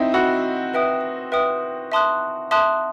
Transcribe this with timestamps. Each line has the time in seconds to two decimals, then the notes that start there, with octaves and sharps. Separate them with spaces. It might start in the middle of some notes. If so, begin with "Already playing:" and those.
Already playing: C4 D#4 E4
0.13 F#4 D#5 F#5 B5 E6
0.74 B4 E5 G5 D#6
1.32 B4 E5 G5 D#6
1.92 E5 A5 C6 D#6 F#6
2.51 E5 A5 C6 D#6 F#6